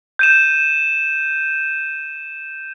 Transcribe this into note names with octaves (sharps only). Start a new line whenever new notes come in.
G6 D#7 E7